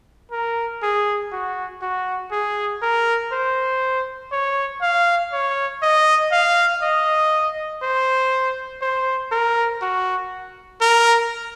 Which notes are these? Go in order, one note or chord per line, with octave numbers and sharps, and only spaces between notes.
A#4
G#4
F#4
F#4
G#4
A#4
C5
C#5
F5
C#5
D#5
F5
D#5
C5
C5
A#4
F#4
A#4